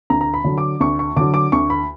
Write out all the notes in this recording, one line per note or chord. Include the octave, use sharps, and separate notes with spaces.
D2 A#5
A#5
B5
D3 F#3
D6
D2 C#6
C#6
D3 F#3 D6
D6
D2 C#6
B5